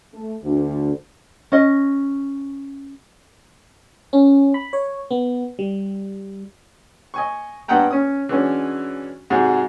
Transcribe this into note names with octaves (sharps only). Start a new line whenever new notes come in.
A3
D2
C#4 D#5
C#4
B5
C#5
B3
G3
D#5 G#5 C#6
G2 B3 D#5 F#5 G5 A#5
C#4 D#6
E3 F#3 G#3 C#4 D4
G#2 C3 F#3 D#4 F#4 G#4